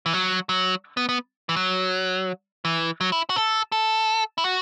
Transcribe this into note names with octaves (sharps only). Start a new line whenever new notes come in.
E3
F#3
F#3
B3
B3
E3
F#3
E3
F#3
E4
F#4
A4
A4
E4
F#4